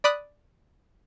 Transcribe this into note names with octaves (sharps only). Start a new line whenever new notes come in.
D5 B5 D#6 F#6